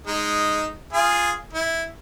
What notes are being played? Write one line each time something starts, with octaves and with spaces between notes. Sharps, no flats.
G#3 D#4
F4 G#4
E4